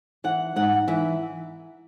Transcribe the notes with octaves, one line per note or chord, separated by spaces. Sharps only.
E3 F#5
G#2 F#5
E3 E5